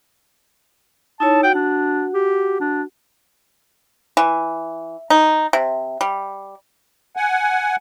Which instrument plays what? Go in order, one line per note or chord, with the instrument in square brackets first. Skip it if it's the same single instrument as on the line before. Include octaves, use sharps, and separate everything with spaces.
[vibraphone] D#4 E4 C#5 [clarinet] A5
[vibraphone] F#4 F#5 [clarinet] G5
[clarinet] D4
G4
D4
[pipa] E3
D#4
C3
G3
[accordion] F#5 G#5